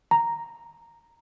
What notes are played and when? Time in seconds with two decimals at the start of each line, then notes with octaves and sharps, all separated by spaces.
0.11 A#5